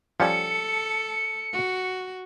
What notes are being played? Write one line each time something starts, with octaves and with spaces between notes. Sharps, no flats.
F3 G3 C#4 A4 C#7
F#4